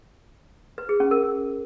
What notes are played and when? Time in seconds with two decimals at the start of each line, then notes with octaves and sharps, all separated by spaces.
0.78 B4
0.89 G#4
1.00 C#4
1.11 A#4